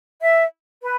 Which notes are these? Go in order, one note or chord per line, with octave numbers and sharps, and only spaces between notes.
E5
B4